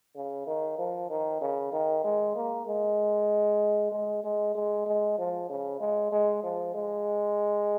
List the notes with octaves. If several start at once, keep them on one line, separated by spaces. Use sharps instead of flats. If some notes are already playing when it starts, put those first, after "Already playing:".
C#3
D#3
F3
D#3
C#3
D#3
G#3
A#3
G#3
G#3
G#3
G#3
G#3
F3
C#3
G#3
G#3
F3
G#3